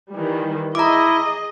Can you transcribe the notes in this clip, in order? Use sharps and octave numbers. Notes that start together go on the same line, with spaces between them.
D#3 E3 G3
E4 G#4 D#5 A#5 D6